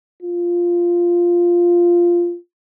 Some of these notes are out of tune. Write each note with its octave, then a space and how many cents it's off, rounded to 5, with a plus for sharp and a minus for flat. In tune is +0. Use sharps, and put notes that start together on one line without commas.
F4 -5